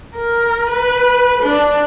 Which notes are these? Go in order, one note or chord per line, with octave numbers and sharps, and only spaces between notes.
A#4
B4
D4